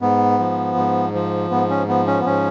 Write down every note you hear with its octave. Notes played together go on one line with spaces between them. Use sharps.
G#2 B3
F3
G#2
F3
G#2 B3
C#4
F3 B3
C#4
B3
G#2 C#4